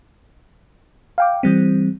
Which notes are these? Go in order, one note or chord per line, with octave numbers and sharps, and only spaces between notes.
F5 G5 D6
E3 G3 C4